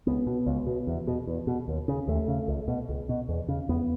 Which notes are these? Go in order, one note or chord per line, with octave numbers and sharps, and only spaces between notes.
C#2 B3
B2
C#2
B2
E2
B2
E2
B2
D#2
C#3
D#2 A3
C#3
C#2
B2
C#2
B2
E2
C#3
E2 B3